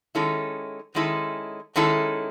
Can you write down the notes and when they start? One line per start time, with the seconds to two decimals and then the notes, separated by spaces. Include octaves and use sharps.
0.15 D#3 G#3 C#4 E4 A4
0.95 D#3 G#3 C#4 E4 A4
1.76 D#3 G#3 C#4 E4 A4